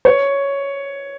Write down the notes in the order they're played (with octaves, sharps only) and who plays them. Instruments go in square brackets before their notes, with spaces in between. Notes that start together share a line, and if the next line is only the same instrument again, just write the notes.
[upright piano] C#5